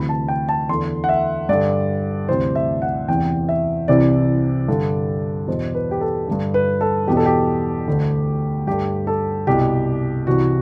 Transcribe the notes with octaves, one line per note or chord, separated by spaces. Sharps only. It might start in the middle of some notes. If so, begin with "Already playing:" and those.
Already playing: D2 C3 E3 B5
A5
G5
A5
E2 D3 C6
F#5
E5
G2 D3 D5
D2 C3 E3 C5
E5
F#5
E2 C3 E3 G5
E5
C2 C3 E3 D5
G2 D3
E2 B2 C5
B4
G4
A4
G2 D3
B4
A4
E2 B2 G4
A4
G4
D2 D3
G2 D3 G4
A4
C2 B2 G4
C2 C3 E3 F#4